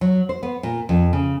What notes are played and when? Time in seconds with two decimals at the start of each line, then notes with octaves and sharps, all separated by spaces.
0.01 F#3
0.29 C5
0.43 B3
0.63 A#2
0.89 F2
1.13 C#3